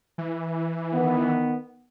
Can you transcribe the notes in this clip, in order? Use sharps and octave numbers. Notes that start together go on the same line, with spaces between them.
E3
D#3 B3